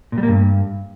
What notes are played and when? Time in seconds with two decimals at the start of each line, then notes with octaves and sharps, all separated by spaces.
0.12 A#2
0.18 G3
0.23 A#3
0.28 G2